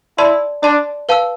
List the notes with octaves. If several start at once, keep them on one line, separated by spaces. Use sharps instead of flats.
E4 D5 A5 C6
D4 D5 A5 C6
B4 F5 A5 E6